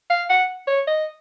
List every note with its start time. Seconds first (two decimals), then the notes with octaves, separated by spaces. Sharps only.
0.10 F5
0.30 F#5
0.67 C#5
0.87 D#5